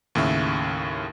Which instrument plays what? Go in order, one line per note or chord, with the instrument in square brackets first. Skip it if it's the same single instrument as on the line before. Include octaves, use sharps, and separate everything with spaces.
[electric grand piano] D#2 A2 C#3 E5